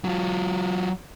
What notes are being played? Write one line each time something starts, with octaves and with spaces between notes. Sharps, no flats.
F#3 F4